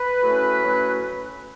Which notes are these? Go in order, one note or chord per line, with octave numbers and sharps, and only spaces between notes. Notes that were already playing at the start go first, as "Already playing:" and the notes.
Already playing: B4
A2 F#3 A3 C#4
A2 F#3 A3 C#4